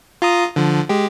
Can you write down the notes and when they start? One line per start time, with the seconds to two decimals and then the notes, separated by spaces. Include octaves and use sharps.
0.22 F4 A#5 D#6
0.56 D3 F3
0.89 G#3 G4